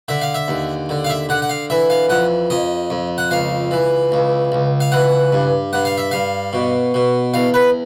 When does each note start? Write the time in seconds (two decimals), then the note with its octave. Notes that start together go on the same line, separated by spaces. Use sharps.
0.08 D3 E5
0.22 F5
0.34 E5
0.48 D#2
0.89 D3
1.04 F5
1.10 E5
1.29 D3 F#5
1.42 F#5
1.49 F5
1.70 E3 E5
1.90 F5
2.09 F2 F#5
2.50 F2 D#5
2.90 F2
3.18 F#5
3.31 C#2 F5
3.71 E3
4.12 C#2
4.52 C#2
4.80 F5
4.92 E3 F#5
5.33 G2
5.73 G2 F#5
5.85 F5
5.98 E5
6.11 G2 F5
6.53 B2
6.94 B2
7.34 E2 F5
7.54 B4